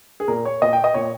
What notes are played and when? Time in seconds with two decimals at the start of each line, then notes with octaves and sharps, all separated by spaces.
0.20 G#4
0.28 A#2 A#4
0.45 C#5
0.62 A#2 D#5
0.73 G5
0.84 D#5
0.94 A#2 C#5